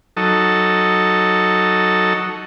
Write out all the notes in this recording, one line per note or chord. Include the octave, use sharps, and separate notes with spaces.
F#3 D#4 A4